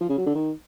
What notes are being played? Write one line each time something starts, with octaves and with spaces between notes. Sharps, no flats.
F3
C#3
F#3
D3
D#3